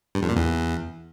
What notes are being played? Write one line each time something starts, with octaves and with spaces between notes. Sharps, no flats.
G2
F2
A#2
E2